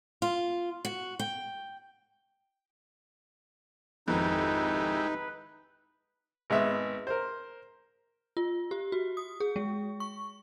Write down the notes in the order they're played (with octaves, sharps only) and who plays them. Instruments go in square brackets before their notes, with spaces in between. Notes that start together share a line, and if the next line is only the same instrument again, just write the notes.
[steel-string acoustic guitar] F4
F#4
G5
[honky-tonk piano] G#1 F2 [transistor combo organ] G#3 E4 G4 [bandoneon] D#4 [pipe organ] B4
[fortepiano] G#1 G#3 B3 E5
A#4 C5
[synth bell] F4
G4
F#4
D#6
G#4
G#3
C#6